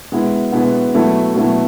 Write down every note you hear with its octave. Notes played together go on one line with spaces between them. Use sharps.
B2 G#3 B3 E4
B2 G#3 B3 E4
B2 F#3 A3 E4
B2 F#3 A3 E4